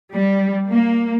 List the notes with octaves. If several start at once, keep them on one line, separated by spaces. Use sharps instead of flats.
G3
A#3